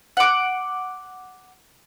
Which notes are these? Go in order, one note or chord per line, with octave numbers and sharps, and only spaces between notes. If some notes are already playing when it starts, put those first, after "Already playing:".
F#5 D6